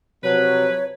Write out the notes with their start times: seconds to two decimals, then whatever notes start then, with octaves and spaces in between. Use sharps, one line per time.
0.24 C3 F3 F#3 B4 C#5